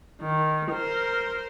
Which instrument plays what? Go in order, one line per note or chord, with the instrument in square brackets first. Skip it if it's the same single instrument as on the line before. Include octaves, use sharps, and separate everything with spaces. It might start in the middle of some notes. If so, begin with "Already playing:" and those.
[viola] D#3
A#4 C5